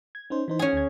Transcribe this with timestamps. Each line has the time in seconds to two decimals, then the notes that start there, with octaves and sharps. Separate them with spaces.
0.15 G#6
0.30 C#4 D#4 C5
0.48 E3 D#4 C5
0.59 C#4 G#4
0.73 D2 G#6